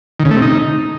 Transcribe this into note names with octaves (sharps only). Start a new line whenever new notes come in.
D#3
C#3
A3
C3
D#4